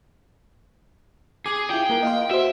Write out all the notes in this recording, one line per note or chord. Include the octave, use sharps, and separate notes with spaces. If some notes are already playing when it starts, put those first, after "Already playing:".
G#4 D6
E4 F4 G5
A#3 A#4
D#5 F5 C6
F#4 C5 E5